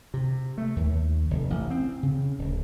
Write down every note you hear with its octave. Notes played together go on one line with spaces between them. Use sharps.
C3
A3
D#2
F1
A1
C4
C#3
D1